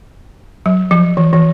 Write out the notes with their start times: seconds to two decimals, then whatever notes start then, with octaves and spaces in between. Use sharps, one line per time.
0.66 F#3
0.91 F3
1.17 E3
1.33 E3